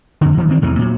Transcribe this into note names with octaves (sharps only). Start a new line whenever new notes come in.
F2 D3
D#1 E3 F3
D#3 E3 C4
A1 E2 C3 E3
A#2 F#3